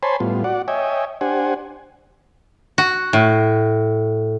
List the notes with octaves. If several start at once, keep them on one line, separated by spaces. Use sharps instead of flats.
C5 C#5 G#5 A5 B5 C6
A2 G3 B3 F4
F#4 D5 F#5
C#5 D#5 E5 G5 G#5
D4 G4 C5 F#5 G#5
F#4
A2